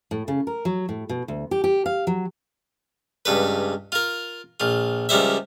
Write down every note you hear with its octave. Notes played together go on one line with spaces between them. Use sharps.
A2
C#3
A#4
F#3
A2
B2
D2
G4
G4
F5
F#3
C#2 G2 B4
F4 A#4
A#1 F4
C#2 F3 G3 C5 E5